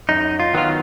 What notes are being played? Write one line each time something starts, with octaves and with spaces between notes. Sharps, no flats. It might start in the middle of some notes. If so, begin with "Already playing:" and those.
F#2 D#4
F4
D#3 F#3 B3 F4